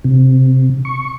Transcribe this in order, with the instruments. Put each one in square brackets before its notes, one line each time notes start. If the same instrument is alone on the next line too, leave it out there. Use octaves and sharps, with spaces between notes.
[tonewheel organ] C3
C#6